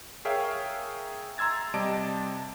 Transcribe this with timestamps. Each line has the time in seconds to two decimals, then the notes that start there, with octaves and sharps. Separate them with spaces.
0.25 G#4 A#4 C#5 E5 F5 G5
1.38 A#5 C6 E6 G#6 A6
1.74 C3 G3 D5 D#5 A5 D7